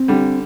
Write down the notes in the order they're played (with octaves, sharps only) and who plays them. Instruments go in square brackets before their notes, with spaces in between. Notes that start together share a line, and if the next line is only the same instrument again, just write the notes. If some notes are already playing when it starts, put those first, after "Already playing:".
Already playing: [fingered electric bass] C4
[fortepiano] D3 G3